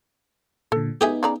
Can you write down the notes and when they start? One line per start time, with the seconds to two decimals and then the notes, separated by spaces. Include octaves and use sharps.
0.72 A#2 D3 A4
1.01 B3 D#4 G4 G#4 E5
1.23 C#3 D5 A#5